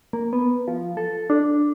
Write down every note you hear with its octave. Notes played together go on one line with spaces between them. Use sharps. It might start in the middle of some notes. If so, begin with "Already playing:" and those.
A#3
B3
F3
A4
D4